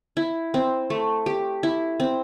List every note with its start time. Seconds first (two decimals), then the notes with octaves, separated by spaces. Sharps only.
0.17 E4
0.54 C4
0.90 A3
1.26 G4
1.63 E4
2.00 C4